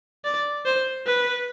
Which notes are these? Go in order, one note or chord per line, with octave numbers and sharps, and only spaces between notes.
D5
C5
B4